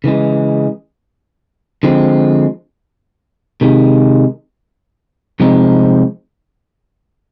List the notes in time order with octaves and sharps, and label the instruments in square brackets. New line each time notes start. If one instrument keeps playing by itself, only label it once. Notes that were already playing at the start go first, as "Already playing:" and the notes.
[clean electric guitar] C#3 E3 G#3
D3 F3 G#3 C4
C3 D#3 G#3
C3 F3 G#3 C4 D#4